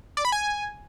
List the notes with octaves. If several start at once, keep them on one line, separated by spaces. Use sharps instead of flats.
D5
B5
G#5